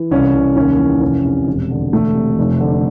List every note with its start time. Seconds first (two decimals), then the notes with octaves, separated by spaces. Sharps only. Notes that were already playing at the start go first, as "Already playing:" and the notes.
Already playing: E3
0.11 C2 C#4
0.33 C2
0.56 D#2 C#4
0.79 E3
1.01 F1 C#4
1.24 C3
1.47 E1
1.70 D3
1.92 E1 A3
2.15 C3
2.38 F1
2.60 D3